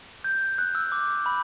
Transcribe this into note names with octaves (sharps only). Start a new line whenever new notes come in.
G6
F#6
E6
D6
B5